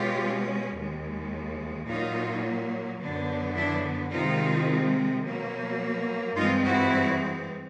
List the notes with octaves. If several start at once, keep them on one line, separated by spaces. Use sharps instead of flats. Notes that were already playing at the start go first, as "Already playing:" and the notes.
Already playing: B2 G#3 C#4 F4 G4
D#2 D#3 G#3
A#2 F#3 A#3 D#4 F4
F#2 D3 F#3 B3 D4
D4 E4
C3 D#3 G#3 C4 D#4 F4
B2 F#3 A#3
G2 E3 G#3 C4 D#4 F4
E4 F#4